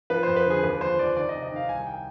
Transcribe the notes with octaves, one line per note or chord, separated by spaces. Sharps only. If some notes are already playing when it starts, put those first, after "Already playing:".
F3 B4
F2 C5
B4
D3 G#4
D#2 B4
F3 C5
F3 D5
D#3 D5
D#5
C3
D#5
D#3 F5
C2 G#5
G5